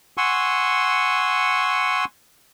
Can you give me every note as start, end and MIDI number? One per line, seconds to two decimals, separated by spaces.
0.18 2.05 78
0.18 2.05 80
0.18 2.05 84
0.18 2.05 85
0.18 2.05 88